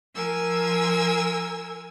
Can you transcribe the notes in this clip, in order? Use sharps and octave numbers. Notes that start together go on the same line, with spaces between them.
F3 A#4 G#5 E6